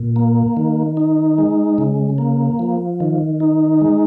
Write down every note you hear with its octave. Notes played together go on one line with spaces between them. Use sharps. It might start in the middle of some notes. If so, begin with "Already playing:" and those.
Already playing: A#2
A#3
D#3
D#4
G#3
C#3
A#3
F3
D#3
D#4
G#3